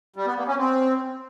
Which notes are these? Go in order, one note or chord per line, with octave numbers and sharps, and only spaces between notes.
G3
B3
A#3
C#4
C4